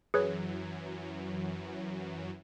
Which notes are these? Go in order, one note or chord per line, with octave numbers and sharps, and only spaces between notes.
F#2 E3 F#3 G#4 B4 C#5